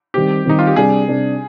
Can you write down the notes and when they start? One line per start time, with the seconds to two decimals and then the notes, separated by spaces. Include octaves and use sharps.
0.14 D#3 G3 C4 G4
0.45 D#3 G3 C4 D#4
0.59 F4
0.67 G4
0.76 C3 G3 D4 G#4
1.08 C3 G3 D4